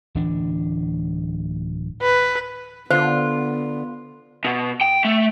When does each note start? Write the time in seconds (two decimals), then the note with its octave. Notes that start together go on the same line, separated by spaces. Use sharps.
0.15 D1 E3 D4
2.02 B4
2.91 D3 B3 F4 C5
4.45 B2
4.81 G5
5.05 A3